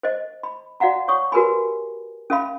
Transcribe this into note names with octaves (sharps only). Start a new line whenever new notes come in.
C5 D#5
B5
F#4 D5 F5 F#5 A#5
C#5 F#5 C#6 D#6
F#4 G4 A#4 B4 G#5 B5
C#4 A4 E5 F5 B5